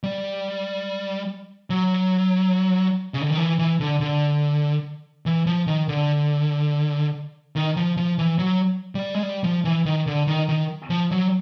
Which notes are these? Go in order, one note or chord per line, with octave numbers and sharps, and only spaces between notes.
G3
F#3
C#3
D3
D#3
E3
E3
D3
D3
E3
F3
D#3
D3
D#3
F3
F3
E3
F#3
G3
G#3
G3
F3
E3
D#3
D3
D#3
D#3
F3
F#3